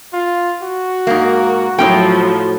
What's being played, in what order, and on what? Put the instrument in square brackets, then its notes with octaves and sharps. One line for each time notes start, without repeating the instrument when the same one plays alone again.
[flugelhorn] F4
F#4
[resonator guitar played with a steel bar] G#2 A#3 [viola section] A#4
[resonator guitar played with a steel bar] A2 D#4 G5 [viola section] F3 F#3